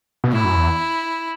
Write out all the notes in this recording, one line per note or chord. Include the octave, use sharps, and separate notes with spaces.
B2
A2 E4
F#2
E2